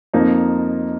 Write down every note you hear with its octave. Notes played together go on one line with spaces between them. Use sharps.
F2 F3 A#3 D#4